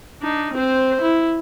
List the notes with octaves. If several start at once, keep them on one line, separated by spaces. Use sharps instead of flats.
D4 D#4
C4 C5
E4